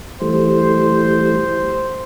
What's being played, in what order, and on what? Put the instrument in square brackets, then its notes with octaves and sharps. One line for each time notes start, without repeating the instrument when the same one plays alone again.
[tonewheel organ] E3 G3 A3 [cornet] C5